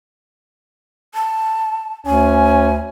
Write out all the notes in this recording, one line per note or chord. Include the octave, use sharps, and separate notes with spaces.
A5
D2 C#4 G#5